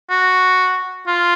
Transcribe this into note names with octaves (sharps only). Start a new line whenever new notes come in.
F#4
F4